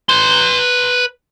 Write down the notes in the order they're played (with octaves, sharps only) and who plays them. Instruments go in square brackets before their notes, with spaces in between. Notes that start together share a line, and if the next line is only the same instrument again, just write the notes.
[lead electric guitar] B4 C6